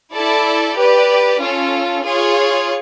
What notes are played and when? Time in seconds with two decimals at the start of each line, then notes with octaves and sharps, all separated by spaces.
0.13 E4 A4 D5
0.76 G4 B4 D5
1.40 C#4 F4 A4
2.05 F4 G#4 C#5